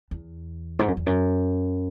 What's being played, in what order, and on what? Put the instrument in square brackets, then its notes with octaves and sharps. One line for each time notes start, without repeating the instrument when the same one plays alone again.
[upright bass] E2
G#2
F#2
E2
F#2